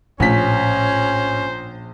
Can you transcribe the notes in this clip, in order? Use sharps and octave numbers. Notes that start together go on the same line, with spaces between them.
A#1 A2 C#4 C5 B6